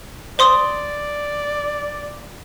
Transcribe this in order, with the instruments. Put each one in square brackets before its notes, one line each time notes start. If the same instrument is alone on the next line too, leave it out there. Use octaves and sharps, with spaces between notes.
[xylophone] C5 C6 D#6 [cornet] D5